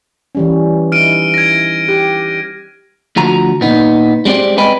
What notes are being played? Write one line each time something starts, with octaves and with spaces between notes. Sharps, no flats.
E3 G3 C#4
D#4 E4 F6 D7 D#7
G#6 A#6
G4 F#6
D2 F3 F#4 A#5
A#2 B3 D#4
G3 G#3 C4 G4 D5
B4 D#5 G5 G#5 B5